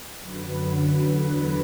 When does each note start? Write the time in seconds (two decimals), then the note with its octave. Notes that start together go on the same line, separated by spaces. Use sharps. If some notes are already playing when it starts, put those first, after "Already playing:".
0.19 F#2 D3 F#3 B4
0.77 E2 D3 F#3